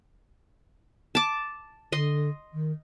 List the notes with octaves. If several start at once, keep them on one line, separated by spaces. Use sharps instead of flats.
A5 D6
D3 D#5 C6
D#3